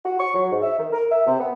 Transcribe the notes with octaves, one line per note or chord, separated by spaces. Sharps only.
F#4
C#6
F#3
G#2
E5
D#3
A#4
E5
C3
B3